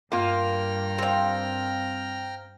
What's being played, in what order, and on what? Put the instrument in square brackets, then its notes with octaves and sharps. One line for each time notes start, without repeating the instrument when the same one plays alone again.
[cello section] G2 [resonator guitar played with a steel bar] A#3 F4 [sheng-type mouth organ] G5 A#5 F6
[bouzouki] C4 F5